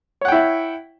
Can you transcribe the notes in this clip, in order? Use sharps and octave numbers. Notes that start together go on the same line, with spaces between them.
E4 C#5 F#5 G5